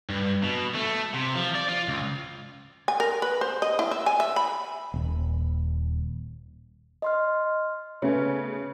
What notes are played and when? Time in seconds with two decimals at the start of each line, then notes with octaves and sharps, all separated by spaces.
0.10 G2
0.43 B2
0.75 A3
1.14 C3
1.35 F3
1.55 D5
1.69 F4
1.88 C#2
2.88 G#5
3.00 A#4
3.22 B4
3.41 C5
3.62 D#5
3.79 E4
3.91 E5
4.06 G#5
4.20 E5
4.36 B5
4.94 D#1
7.02 D#5 C6 F6
8.02 C#3 A3 B3 C#4 C#5